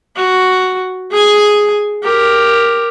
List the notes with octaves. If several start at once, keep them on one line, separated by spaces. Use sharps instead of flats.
F#4
G#4 G#5
G4 A#4